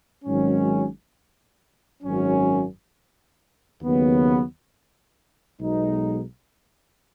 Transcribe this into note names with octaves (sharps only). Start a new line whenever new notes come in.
G#1 G#2 D#3 F#3 C#4
G#1 F#2 F#3 C#4
D#2 C#3 F#3 B3
B1 B2 G#3 D#4